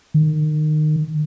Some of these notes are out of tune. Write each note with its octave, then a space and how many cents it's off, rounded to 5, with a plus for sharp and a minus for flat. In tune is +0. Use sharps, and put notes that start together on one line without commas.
D#3 -25